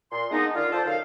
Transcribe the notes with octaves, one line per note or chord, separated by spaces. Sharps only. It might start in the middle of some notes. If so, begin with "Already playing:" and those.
A#2 C6
G#3 A#3 B3 D4 D#4
D3 D#3 F4
F4 A4 C5 D5
F#2 D#3 F5